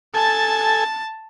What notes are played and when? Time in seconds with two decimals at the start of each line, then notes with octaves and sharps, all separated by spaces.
0.14 A4 G#5 A5 A6